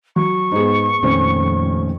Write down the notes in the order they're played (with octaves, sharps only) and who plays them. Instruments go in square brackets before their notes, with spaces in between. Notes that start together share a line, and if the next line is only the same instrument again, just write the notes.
[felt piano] F#3 [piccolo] C#6
[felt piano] G#2 G#4 [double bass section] B3
[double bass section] F2 [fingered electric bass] A#2 D#3 A3 [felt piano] C4 C#4